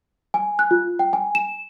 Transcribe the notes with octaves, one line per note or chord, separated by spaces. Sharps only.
G#5
F#6
F4
G5
G#5
E7